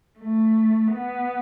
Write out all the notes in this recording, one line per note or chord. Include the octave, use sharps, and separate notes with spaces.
A3
B3